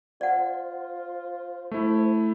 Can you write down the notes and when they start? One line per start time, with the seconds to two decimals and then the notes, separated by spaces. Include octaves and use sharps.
0.21 F4 C5 D5 F#5
1.71 A3 E4